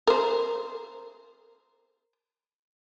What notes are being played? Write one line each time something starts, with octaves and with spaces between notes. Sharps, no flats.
A#4 C5